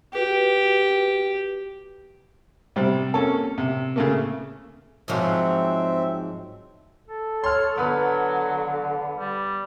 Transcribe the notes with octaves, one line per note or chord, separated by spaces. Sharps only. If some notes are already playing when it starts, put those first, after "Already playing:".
F#4 G4 B4 G5
C3 G3 C4
A#3 C#4 A4
C3
C#3 A3 A#3
G#2 F3 F#3 C4 E5
A4
C#5 C6 F6
D3 F#3 B3 B4
G3